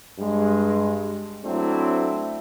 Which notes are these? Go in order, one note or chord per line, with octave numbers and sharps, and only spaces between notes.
G2 G#3
F#3 A3 C4 D4 E4